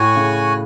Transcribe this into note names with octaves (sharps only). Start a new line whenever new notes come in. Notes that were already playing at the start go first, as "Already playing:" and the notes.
Already playing: A2 F#4 C#5 G#5
C#3